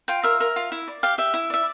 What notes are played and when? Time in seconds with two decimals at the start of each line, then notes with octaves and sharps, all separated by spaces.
0.08 F4 G5
0.23 A#4 E5
0.40 A#4
0.56 F4
0.72 E4
0.88 D5
1.03 G4 F5
1.18 G4 E5
1.34 E4
1.50 D5 E5